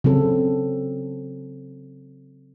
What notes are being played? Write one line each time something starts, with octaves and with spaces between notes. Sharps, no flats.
C#3 F#3 C4 A4